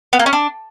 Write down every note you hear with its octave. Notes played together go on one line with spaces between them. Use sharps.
B3
A#3
C#4
D4